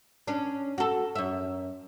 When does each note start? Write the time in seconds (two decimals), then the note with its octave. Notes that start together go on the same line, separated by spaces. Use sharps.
0.28 C#4 D4
0.78 F#4 A4
1.16 F#2 E5